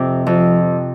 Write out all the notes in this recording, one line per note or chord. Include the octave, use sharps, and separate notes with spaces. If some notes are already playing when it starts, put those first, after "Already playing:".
Already playing: F2 C3
F2 F3